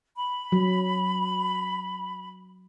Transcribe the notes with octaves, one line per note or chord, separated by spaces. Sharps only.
B5
F#3